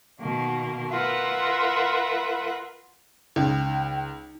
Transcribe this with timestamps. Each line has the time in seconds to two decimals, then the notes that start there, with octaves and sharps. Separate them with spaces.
0.20 B2 D#3 A#3
0.90 F4 A#4 B4 E5 F#5
3.36 C#2 D#4 G5